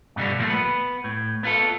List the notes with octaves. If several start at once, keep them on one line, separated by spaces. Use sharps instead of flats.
G2 B2 D3 G3
A#2 F3 G#3 A3
B3 B4
A2
B3 F4 A4